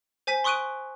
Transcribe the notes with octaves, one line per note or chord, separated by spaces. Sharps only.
C5 G#5 B6 D#7
C6 C#6 D#6 F#6 D7 D#7